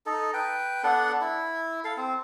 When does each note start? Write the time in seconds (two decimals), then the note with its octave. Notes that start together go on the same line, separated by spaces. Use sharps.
0.06 D#4 A4
0.34 B4 G5
0.84 B3 D4 A4 F#5
1.21 E4
1.84 A4 F5
1.97 C4